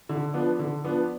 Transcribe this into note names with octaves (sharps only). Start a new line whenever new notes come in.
D3
F3 B3 D4
D3
F3 B3 D4